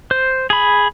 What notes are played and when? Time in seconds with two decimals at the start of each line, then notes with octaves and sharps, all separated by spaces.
0.11 C5
0.50 G#4 B5